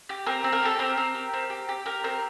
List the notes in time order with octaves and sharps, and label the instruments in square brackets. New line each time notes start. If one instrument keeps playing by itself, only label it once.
[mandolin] G4
C4 A#4
C4
A#4
G4 A4
C4 A#4
C4
G4
C4
G4
G4
G4 A#4
C4 A#4